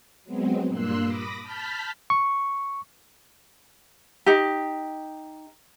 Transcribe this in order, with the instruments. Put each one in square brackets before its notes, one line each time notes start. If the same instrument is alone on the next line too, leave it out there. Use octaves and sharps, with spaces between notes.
[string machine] F#3 G#3 B3 C4
G2 A#2 A#3 C6 E6 F#6
B5 D6 D#6 A#6
A5 B5 F6 G6 A6 B6
[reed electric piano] C#6
[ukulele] D#4 G4